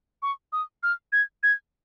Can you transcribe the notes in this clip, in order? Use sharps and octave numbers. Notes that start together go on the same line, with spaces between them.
C#6
D#6
F6
G#6
G#6